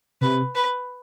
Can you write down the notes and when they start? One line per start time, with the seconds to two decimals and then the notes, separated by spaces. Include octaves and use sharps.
0.21 C3 B4
0.55 B4